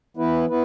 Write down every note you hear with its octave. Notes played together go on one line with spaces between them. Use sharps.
E3 B3 E4 B4
B3 E4 B4